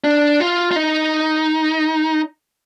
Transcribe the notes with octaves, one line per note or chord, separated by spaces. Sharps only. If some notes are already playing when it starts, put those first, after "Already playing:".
D4
F4
F4
D#4